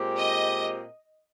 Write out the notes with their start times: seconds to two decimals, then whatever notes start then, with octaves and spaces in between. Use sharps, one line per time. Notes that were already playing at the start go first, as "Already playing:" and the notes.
Already playing: A#2 G#3 C4 G4
0.18 D#5